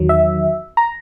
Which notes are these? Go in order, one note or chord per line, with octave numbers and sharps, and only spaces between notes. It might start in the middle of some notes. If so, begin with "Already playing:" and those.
Already playing: E2 D#3 F#3
E5
A#5